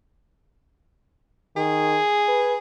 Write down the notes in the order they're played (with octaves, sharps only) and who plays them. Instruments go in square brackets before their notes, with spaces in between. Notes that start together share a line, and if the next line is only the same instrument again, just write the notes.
[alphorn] D#3 [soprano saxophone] G#4
[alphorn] B4